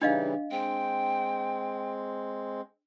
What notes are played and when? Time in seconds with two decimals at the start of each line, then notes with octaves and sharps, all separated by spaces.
0.02 C#3 E3 G3 D4 D#4 D#5 F5
0.51 G#3 C4 G5